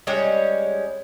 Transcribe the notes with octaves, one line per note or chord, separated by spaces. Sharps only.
G3 G#3 C#4 C#5